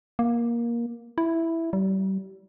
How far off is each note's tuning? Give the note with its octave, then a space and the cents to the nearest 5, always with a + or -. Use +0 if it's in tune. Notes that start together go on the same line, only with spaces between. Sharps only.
A#3 +15
E4 +0
G3 -35